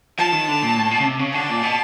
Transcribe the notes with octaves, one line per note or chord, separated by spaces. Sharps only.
F3 A5
D#3
D3
A#2
A2
A#2
C#3
C3
C#3
D3 A5
A#2
B2